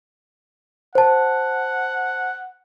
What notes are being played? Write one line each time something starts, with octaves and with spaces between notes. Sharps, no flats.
C5 F#5 A5